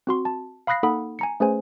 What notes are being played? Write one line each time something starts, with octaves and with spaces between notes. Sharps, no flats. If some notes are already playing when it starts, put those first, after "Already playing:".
C4 F#4 C6
A5
F5 B5 D#6 F#6 A#6 C7
A#3 D#4 A4 F#5 B5 D#6
G#5 A#5 C#7
A3 C#4 G#4 B4 C5 G#5